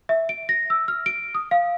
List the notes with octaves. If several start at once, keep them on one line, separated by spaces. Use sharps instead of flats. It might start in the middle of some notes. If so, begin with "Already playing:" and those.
E5
D7
A#6
E6
F6
D7
D#6
F5